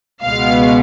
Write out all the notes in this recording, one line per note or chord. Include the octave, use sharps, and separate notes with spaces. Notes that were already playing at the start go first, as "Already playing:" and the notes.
C#2 B2 G#3 B3 F5